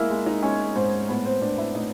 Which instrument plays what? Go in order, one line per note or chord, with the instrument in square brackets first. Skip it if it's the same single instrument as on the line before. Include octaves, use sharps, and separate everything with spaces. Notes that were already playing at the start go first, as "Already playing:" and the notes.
Already playing: [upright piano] G#3 A#3 E4 A#4 E5
G#3
D#4 D#5
G#3 C#4 C#5
G#2 C4 C5
A2 B3 B4
C4 C5
A2 D4 D5
E4 E5
A2 D#4 D#5